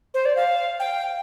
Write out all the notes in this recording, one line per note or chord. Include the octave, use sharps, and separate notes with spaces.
C5
D5
F5
G5